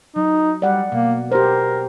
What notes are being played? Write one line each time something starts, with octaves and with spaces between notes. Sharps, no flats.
F#3 D#4
G3 D5 F#5
B2 A#3
G4 A#4 C5